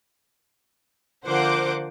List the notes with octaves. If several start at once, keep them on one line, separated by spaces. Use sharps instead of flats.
D3 F3 A#3 C5 F#5 D6